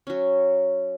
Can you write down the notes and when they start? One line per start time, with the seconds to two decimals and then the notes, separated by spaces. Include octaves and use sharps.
0.07 F#3 C#4